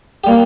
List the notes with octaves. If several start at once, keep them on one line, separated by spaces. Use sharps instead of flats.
G3 A#3 G4